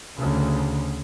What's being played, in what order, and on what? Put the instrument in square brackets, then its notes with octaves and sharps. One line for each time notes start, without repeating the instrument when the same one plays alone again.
[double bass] D2 C#3